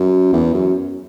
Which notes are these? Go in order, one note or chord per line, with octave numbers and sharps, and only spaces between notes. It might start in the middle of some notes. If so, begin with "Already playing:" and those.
Already playing: F#2
E2
F#2